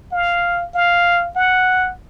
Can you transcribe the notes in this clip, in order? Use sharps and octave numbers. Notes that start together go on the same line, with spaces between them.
F5
F5
F#5